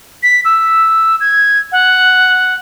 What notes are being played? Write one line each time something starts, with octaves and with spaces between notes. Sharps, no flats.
B6
E6
G#6
F#5